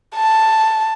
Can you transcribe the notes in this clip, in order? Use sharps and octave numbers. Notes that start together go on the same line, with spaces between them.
A5